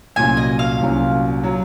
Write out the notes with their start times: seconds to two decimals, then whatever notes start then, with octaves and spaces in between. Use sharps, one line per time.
0.16 C2 A#2 F#3 C#4 G#5
0.37 D#5
0.59 F5
0.79 C2 A#2 F#3 C#4
1.44 F#3